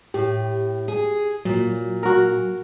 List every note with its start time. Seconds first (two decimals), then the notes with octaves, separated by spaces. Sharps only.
0.14 A2 G4
0.88 G#4
1.45 A#2 F#3
2.03 F#4 A#4